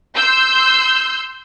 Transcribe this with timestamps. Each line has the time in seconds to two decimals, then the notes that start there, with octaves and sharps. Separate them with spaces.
0.16 C6 E6 G6